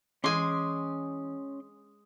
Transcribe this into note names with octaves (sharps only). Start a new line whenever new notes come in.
E3 G#3 C#4 G#5 C6 D6